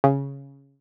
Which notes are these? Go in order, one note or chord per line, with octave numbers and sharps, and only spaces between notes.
C#3